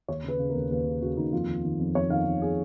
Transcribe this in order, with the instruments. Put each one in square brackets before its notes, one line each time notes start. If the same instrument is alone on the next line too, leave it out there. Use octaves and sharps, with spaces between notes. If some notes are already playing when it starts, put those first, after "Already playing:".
[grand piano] D#2 C#5
C#3 B4
C#3
A#4
D#2
D#2 B4
C#3
C#3 F#4
D#2 D#4
F2 F4
D#3
D#3
F2
F2 C#5
D#3 F5
D#3
G#4